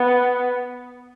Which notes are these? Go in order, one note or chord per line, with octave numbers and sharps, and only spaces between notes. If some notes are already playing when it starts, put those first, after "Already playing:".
Already playing: B3